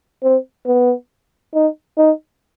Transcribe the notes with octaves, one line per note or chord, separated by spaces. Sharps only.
C4
B3
D#4
D#4